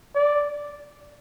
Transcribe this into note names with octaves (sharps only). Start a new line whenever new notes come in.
D5